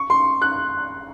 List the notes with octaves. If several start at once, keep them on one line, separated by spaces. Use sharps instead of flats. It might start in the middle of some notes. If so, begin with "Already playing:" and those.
Already playing: C#6
C6
F#6